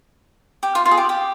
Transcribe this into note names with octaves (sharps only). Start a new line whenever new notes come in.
G4
F4
F4
G#4
G4
G4